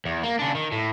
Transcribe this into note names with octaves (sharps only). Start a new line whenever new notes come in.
E2
A#3
C#3 D4
D#3
A2